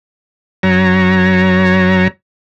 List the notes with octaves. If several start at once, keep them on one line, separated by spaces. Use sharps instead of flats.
F#2 F#3 C#5 A#5